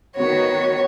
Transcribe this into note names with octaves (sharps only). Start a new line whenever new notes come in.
D#3 B3 F#4 C#5